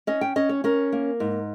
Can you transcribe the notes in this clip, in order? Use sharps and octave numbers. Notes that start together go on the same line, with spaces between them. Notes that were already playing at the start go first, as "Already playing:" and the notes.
C#4 D#5
G5
C#4 D#5
C#5
C#4 A#4
A#3
G#2